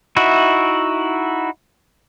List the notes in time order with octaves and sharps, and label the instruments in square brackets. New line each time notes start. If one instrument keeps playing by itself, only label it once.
[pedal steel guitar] D#4 E4 F#4 E5